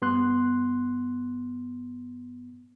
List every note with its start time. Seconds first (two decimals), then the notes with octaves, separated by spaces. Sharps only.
0.02 G2 B3 C6 F#6